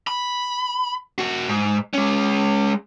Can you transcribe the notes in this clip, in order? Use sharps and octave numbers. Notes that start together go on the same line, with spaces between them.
B5
A#3 F#4
G#2
G#3 C#4